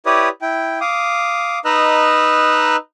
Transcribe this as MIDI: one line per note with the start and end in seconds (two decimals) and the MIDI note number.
0.06 0.29 64
0.06 0.29 67
0.06 0.29 71
0.06 0.29 73
0.06 0.29 74
0.06 0.29 87
0.42 0.79 64
0.42 0.79 79
0.81 1.59 77
0.81 1.59 86
0.81 1.59 87
1.65 2.76 63
1.65 2.76 71
1.65 2.76 75
1.65 2.76 82
1.65 2.76 88
1.65 2.76 90